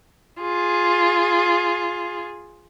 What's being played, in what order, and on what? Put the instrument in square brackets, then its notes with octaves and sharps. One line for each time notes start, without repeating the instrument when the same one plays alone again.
[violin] F4 G#4